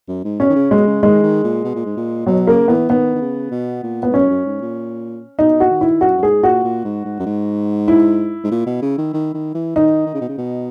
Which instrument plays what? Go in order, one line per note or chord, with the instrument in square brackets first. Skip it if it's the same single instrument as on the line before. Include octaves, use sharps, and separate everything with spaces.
[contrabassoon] F#2
G#2
[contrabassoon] B2 [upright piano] C#4
[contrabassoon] D#3
C#3
[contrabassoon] B2 [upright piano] G#3
[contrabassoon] C#3
[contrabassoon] D#3 [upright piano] G#3
[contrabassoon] D#3
A#2
B2
A#2
G#2
A#2
[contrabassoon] B2 [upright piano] F#3
[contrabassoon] C#3 [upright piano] A#3
[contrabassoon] E3 [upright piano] B3
[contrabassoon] D#3 [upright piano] B3
[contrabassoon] D#3
C#3
B2
A#2
[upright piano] B3
[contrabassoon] G#2
[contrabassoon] F#2 [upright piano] C#4
[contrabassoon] F#2
G#2
A#2
[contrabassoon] B2 [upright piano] D#4
[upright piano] F#4
[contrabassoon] D#3
[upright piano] E4
[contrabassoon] F#2 [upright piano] F#4
[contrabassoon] F#2
[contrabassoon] G#2 [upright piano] G#4
[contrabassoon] A#2 [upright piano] F#4
[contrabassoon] A#2
G#2
G#2
F#2
G#2
[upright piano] E4
[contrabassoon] G#2
A#2
B2
C#3
D#3
D#3
D#3
E3
[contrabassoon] D#3 [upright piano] D#4
[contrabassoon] D#3
C#3
B2
C#3
B2